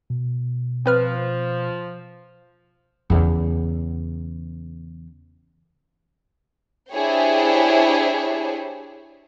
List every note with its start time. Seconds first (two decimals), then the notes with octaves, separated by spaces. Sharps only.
0.10 B2
0.86 F3 C4 B4 F6
3.10 E2 C#3
6.92 D4 E4 G4 G#4 C5 C#5